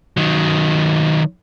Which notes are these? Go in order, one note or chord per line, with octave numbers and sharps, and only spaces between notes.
D#3 F#3